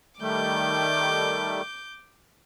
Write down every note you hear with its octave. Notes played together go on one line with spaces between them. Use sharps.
D#3 G3 A3 D6 G6